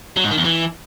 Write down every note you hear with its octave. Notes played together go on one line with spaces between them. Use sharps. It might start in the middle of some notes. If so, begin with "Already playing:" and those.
F#3
G#2
D#3
E2
E3